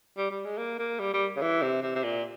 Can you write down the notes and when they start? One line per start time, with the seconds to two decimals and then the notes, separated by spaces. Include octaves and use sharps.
0.17 G3
0.31 G3
0.45 G#3
0.58 A#3
0.79 A#3
0.99 G3
1.14 G3
1.36 C#3
1.42 E3
1.62 C3
1.82 C3
1.95 C3
2.04 A#2